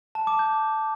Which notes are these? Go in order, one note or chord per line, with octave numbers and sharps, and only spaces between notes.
A5
D6
G6